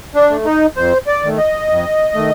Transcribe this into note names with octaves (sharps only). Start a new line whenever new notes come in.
D4
A3
D#4
F2 C5
D5
D#3 A3
D#5
F2
D#3 A3